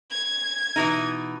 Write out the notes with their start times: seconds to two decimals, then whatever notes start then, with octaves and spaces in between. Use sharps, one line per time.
0.11 G#6
0.76 B2 E3 D#4